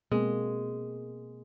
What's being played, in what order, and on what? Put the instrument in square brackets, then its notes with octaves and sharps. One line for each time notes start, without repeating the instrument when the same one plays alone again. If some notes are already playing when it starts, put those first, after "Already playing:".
[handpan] B2 A#3 C4 [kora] G#3